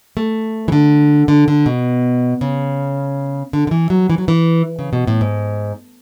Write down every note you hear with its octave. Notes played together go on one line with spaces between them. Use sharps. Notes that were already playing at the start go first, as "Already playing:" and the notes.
A3
E3
D3
D3
D3
B2
C#3
D3
D3
E3
F#3
E3
F#3
E3
C#3
B2
A2
G#2